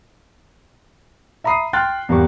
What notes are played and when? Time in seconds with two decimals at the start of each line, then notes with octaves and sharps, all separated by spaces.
1.44 E5 A#5 B5 D#6 C7
1.73 G5 C6 F6 F#6 A6
2.09 E2 G2 A#3 G4 C#6